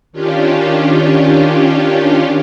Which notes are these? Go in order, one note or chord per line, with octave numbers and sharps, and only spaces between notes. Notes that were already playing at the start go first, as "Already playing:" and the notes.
D#3 C#4 D4 F4 G4